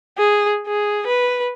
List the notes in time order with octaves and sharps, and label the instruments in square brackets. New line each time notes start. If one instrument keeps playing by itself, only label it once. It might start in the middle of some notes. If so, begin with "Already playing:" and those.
[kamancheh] G#4
G#4
B4